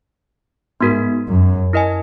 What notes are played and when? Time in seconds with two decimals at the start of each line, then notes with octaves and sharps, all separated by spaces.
0.80 G#2 B3 D#4 F#4 A#4
1.27 F#2
1.73 E4 A#4 D#5 G#5